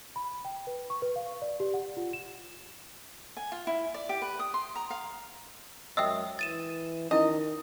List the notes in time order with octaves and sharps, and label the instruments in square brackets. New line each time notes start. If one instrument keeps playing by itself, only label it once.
[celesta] B5
G5
B4
C#6
B4
F5
D5
G4
F#5
F4
E7
[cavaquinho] G#5
F4
E4
D5
G4
B4
D#6
C6
A#5
F5
[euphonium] F#2 [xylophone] D#5 E5 G5 [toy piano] D#6 E6
[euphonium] E3 [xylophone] A6 D#7 E7
[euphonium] D#3 [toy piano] C#4 E4 [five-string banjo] D#5